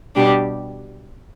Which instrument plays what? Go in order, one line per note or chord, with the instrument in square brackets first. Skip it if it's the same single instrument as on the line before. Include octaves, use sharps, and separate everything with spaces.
[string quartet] B2 G3 D4 G4